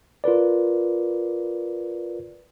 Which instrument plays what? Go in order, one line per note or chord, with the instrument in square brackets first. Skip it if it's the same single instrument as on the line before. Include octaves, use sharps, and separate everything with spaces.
[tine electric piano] F4 A#4 B4 D5